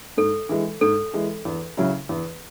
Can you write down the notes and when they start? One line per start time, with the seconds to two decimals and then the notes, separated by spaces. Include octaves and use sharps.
0.17 G#2 A4
0.49 E3 G#3
0.81 G#2 A4
1.14 E3 G#3
1.45 E2
1.77 C#3 F#3 C#4 E4
2.09 E2